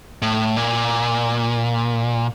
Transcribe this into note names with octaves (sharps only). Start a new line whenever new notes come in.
A2
A#2